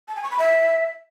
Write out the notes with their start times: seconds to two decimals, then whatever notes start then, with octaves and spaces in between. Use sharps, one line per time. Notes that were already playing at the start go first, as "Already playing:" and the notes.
0.08 A5
0.16 G#5
0.23 C#6
0.31 B5
0.39 E5